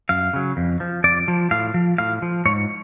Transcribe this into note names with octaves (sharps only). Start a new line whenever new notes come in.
F#2 F5
C#3 F#3
F2
F3
F2 D5
F3
A2 F5
F3
A2 F5
F3
G#2 C#5